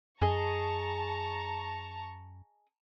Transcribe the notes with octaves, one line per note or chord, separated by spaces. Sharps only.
F#2 G#4 D#5 A5 A#5 C#6